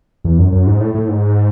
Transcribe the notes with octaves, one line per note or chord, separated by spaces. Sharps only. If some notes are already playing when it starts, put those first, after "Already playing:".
E2
F#2
F#2
G#2
A2
A2
G#2